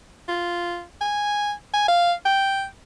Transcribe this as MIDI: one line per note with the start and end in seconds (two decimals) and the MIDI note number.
0.28 0.82 65
1.01 1.52 80
1.73 1.87 80
1.88 2.12 77
2.26 2.64 79